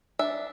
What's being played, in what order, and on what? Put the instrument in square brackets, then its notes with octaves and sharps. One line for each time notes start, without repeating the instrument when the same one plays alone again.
[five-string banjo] D4 E5